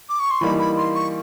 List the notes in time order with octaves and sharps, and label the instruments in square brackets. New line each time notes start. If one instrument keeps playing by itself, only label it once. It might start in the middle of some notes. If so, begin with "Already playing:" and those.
[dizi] D6
C#6
C6
[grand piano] E3 G3 A#3 D#4 [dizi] B5
[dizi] B5
C6
C#6